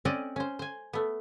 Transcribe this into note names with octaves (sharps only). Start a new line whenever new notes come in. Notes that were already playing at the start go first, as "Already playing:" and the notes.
C4 C#4 D5 D#5 F#5
C#4 C5
C5 G#5
A3 B3